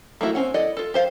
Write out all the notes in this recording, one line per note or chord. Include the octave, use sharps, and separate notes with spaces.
A3 A#3 E4 F#4
C4 C#4 F#5
E4 A4 D5 D#5 F#5
F4 A4
G4 C5 F5